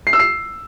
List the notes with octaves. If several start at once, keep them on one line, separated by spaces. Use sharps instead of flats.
C7
E6
C7